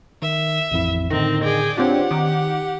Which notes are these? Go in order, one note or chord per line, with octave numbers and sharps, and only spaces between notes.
D#3 E5
A1 F2 E4
A2 D3 D#3 C4 A#6
G#4 D5 G5
C4 D4 F4 G4 C#5 F#5
D#3 D6